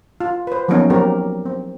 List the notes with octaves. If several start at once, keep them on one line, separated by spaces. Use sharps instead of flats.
F4
B4 C5
F3 F#3 A#3 B3 C#4 D#4
F#3 C4 G4 A#4
C4